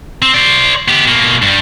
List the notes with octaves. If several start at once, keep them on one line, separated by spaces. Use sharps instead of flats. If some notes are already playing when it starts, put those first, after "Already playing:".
C4
C5 D5
B3 G4
B2 A#3
G2 G3